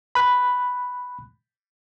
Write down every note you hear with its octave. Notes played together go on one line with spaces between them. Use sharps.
B5 F#6